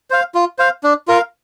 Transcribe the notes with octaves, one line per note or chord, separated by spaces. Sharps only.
C5 F5
F4
C5 F5
D4
F4 A#4 F5